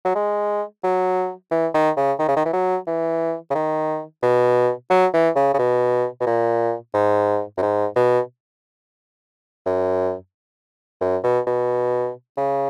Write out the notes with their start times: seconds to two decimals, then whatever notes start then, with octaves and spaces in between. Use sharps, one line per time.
0.05 F#3
0.15 G#3
0.84 F#3
1.51 E3
1.74 D#3
1.97 C#3
2.19 D#3
2.28 C#3
2.36 D#3
2.45 E3
2.53 F#3
2.87 E3
3.50 C#3
3.55 D#3
4.23 B2
4.90 F#3
5.14 E3
5.36 C#3
5.54 C#3
5.59 B2
6.20 B2
6.27 A#2
6.94 G#2
7.58 F#2
7.62 G#2
7.96 B2
9.66 F#2
11.01 F#2
11.24 B2
11.47 B2
12.37 C#3